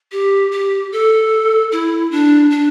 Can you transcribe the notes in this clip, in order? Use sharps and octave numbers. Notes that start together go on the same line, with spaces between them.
G4
G4
A4
E4
D4
D4